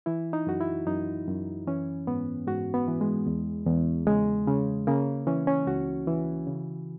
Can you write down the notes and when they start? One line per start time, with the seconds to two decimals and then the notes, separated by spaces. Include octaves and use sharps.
0.06 E3 E4
0.33 D#4
0.47 F#2 F#4
0.61 E4
0.86 F#2 D#4
1.27 F#2
1.67 E3 C#4
2.07 G#2 B3
2.47 G#2 F#4
2.74 B3
2.87 E3
3.01 G#3
3.26 E2
3.67 E2
4.07 C#3 G#3
4.47 C#3
4.87 C#3 A#3
5.27 E3 C#4
5.47 C#4
5.67 C#2 F#4
6.07 E3
6.47 C#3